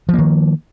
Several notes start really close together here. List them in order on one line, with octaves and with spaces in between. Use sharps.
F3 A#3 D#3